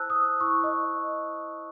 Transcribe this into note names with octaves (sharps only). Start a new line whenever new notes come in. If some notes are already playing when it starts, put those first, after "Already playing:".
Already playing: E4 C5 A5 E6 F#6
D#6
E4 C#6
D#5